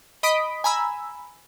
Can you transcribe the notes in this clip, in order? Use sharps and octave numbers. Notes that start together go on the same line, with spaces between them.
D#5 B5 D#6 B6 D7
G#5 A#5 B5 E6